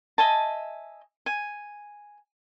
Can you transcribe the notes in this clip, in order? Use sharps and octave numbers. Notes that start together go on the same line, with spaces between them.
D#5 E5 G#5 A5
G#5